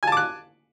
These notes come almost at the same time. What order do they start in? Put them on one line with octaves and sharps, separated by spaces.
G#5 A5 D6 F#6